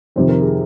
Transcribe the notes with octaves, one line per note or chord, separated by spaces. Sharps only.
F2 C3 D#3 C5
A#4
G#4